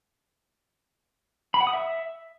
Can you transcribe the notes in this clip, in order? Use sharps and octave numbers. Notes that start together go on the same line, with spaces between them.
B5
F#5
D#6
E5